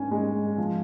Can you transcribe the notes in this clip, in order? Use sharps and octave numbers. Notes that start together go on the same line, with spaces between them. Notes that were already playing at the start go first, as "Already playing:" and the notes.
Already playing: G#2 D#3 C#4 G#5
G#3
F3